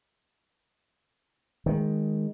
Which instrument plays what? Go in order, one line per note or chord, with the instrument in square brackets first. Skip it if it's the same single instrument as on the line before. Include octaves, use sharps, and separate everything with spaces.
[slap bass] D#3 G#3